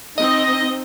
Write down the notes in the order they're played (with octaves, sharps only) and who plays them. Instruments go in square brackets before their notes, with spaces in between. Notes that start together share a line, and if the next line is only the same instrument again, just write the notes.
[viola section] C4 D#4 [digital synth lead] D#5